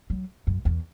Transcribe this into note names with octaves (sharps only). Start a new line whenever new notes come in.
F#3
F#2
E2